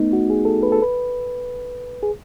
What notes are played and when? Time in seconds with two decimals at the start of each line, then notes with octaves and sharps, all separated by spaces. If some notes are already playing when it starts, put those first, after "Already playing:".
Already playing: A3 B3 D#4
0.13 F#4
0.30 G#4
0.45 A4
0.63 B4
0.72 A4
0.82 B4
2.03 G#4